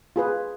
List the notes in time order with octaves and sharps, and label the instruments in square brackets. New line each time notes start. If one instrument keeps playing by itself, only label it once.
[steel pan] F4 G#4 B4